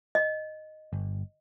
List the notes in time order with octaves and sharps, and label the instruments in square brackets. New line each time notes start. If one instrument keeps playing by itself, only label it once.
[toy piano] D#5
[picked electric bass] G1